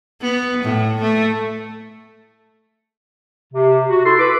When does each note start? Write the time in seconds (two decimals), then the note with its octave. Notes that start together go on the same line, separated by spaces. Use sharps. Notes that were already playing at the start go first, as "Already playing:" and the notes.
0.22 B3
0.63 A2
1.01 A3
3.53 C3
3.89 F#4
4.05 E4 A4 C6
4.19 B4 D6